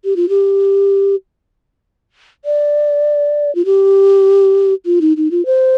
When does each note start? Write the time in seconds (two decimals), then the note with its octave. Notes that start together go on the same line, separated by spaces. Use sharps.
0.05 G4
0.16 F4
0.29 G4
2.45 D5
3.55 F4
3.65 G4
4.86 F4
5.01 D#4
5.17 D#4
5.31 F4
5.46 C5